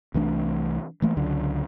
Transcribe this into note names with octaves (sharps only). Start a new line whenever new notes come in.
C2 E3 A3 D4
E3 A3 A#3
C#2 D3 F#3